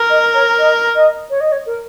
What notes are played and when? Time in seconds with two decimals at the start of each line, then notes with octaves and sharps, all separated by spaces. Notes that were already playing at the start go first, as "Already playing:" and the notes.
Already playing: A#4
0.10 D#5
0.34 C#5
0.58 D#5
0.95 D#5
1.30 C#5
1.40 D#5
1.52 C#5
1.66 A#4